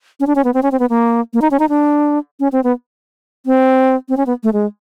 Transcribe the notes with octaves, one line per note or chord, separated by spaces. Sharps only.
C#4
D4
C#4
B3
C4
C#4
C4
B3
A#3
A#3
D#4
C#4
D#4
D4
C#4
C4
B3
C4
C4
C#4
B3
A3
G#3